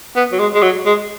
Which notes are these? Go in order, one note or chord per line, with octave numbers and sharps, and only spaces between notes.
B3
F#3
G#3
G#3
F#3
G#3